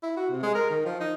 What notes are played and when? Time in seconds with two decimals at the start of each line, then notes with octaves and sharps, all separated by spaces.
0.03 E4
0.17 F#4
0.30 C3
0.43 G#3
0.55 A#4
0.70 D#3
0.85 F3
1.00 D#4